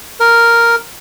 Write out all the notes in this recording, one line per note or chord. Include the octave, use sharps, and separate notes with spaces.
A#4